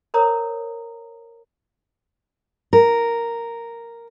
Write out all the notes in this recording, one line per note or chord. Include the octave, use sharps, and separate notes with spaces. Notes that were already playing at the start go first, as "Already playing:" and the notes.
A#4 C5 C#5 A#5 D#6
A#4